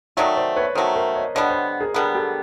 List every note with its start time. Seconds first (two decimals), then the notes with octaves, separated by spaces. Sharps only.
0.17 D#3 F#3 A3 D5 E5
0.36 C5 D5
0.56 B4 C#5
0.75 D#3 F#3 A3 A#4 C5
0.96 A#4 C5
1.15 C#5 D#5
1.35 D3 G3 B3 C#5 D#5
1.50 C5 D5
1.80 G#4 A#4
1.94 D3 G3 B3 G#4 A#4
2.15 G4 A4